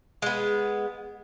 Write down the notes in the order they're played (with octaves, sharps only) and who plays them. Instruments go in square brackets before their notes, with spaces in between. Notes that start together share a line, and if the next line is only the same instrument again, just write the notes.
[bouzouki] G#3 B3